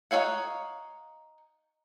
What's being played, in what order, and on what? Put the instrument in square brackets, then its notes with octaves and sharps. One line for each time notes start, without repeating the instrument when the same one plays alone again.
[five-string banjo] D#4 A4 C#5 F5 F#5